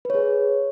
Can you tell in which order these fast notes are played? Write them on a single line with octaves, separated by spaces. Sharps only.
B4 C#5 G#4